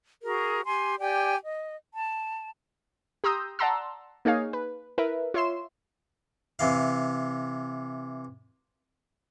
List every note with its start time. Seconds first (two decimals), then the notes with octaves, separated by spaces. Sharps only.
0.22 F#4 G#4 A#4
0.65 G4 G#5 C6
0.99 G4 D5 G5 G#5
1.43 D#5
1.94 A5
3.24 G4 A#5 C6 D#6 E6 G6
3.59 D5 F#5 A5 A#5 C6 E6
4.25 A#3 D#4 G#4 C#5 F5 G#5
4.53 B4
4.98 E4 A#4 B4 E5
5.34 F4 C#5 E5 C6 C7 E7
6.59 C3 E3 F5